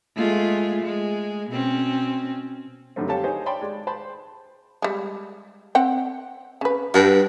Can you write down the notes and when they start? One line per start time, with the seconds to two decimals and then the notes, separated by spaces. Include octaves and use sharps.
0.16 G#3 A3 F4
0.83 G#3
1.50 B2 C4 C#4
2.96 F#2 D3 D#3 G3 A3 C4
3.09 G4 A4 C#5 F5 G5 A5
3.24 D#4 G#4 C5 C#5
3.46 C#5 D5 G5 A5 B5 C6
3.61 G#3 D5
3.87 C5 A5 B5 C6
4.82 G3 G#3
5.75 C4 F#5 G5
6.61 C#3 B4
6.94 G2 F#4